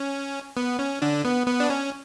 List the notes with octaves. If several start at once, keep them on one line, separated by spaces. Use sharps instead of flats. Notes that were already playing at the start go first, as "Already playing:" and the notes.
Already playing: C#4
B3
C#4
D3 D4
B3
B3
D4
C#4